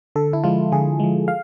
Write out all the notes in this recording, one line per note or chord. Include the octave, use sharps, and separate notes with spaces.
D3 A4
E4
F3 G#3 F4
D3 G#4
F3 G#3
F5